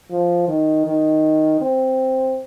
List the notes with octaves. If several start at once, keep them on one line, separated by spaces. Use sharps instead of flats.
F3
D#3
D#3
C4